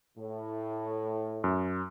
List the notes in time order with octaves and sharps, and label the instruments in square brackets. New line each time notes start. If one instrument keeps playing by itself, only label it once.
[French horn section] A2
[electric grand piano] F#2